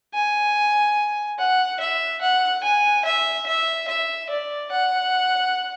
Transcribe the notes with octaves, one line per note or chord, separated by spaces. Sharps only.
G#5
F#5
E5
F#5
G#5
E5
E5
E5
D5
F#5